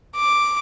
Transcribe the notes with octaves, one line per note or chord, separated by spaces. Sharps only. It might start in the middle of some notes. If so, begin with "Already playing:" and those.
D6